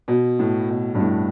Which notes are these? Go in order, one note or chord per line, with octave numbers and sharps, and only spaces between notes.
B2
A2
B2
G2
A2